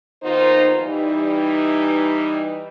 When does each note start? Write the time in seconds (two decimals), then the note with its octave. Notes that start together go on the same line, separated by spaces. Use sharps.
0.23 B2 D#3 A#3 D#4 F4 C5
0.80 E3 G3 D#4